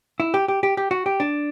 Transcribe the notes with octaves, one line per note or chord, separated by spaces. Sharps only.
E4
G4
G4
G4
G4
F#4
G4
D4